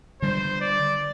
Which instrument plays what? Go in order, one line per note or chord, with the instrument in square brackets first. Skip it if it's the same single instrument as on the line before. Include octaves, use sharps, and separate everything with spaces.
[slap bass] D3 G3 [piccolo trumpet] C5
[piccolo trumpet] D5